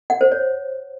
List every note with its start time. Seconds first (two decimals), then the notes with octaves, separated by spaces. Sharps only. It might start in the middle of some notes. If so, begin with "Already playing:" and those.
0.10 F#5
0.21 C5
0.32 C#5